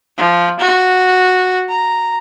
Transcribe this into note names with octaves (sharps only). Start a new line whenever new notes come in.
F3
F#4
A#5